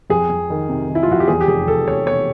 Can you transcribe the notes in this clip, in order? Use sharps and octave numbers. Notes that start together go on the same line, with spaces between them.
F2 G#4
F2
D#3
C3
D#3
E4
F4
F2 F#4
G4
E2 G#4
G4
F1 G#4
F1 A4
F1 C#5
B2 C#5